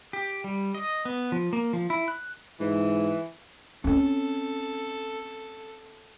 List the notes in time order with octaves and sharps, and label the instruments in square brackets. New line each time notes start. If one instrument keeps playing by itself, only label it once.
[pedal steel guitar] G4
G3
D#5
B3
F3
A#3
F3
E4
F#6
[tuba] G#2 [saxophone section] E3
[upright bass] C4 C#4 [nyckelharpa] A4